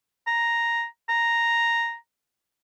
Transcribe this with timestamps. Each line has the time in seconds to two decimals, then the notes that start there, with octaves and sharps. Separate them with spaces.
0.27 A#5
1.09 A#5